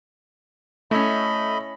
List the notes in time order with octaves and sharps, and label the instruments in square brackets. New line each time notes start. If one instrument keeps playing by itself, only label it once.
[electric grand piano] A3 [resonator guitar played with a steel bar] C#4 E4 [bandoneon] D#5 B5